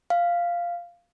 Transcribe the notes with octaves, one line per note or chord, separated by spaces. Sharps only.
F5